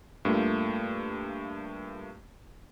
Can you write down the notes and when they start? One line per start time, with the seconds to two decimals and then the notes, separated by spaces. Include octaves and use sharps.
0.25 G2 A3 A#3 F4